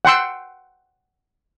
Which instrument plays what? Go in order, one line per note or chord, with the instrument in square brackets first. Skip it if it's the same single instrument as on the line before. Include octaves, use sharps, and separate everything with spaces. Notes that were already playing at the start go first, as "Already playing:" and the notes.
[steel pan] F#5 G5 C6 E6